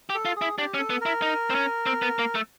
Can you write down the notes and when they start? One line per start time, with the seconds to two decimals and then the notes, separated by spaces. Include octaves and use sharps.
0.10 G4
0.15 A4
0.25 F4
0.36 G#4
0.41 E4
0.58 D4 G4
0.74 C#4
0.79 A4
0.90 B3
1.01 E4 A#4
1.22 D#4
1.50 C4
1.55 C#4
1.86 C4
2.02 B3
2.19 A#3
2.35 A3